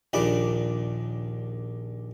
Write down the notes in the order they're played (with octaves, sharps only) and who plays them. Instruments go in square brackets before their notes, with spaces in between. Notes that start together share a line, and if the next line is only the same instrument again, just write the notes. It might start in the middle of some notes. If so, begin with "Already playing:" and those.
[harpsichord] A#1 D#2 A#2 D4 B5